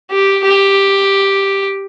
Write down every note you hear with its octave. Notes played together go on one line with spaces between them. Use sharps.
G4
G4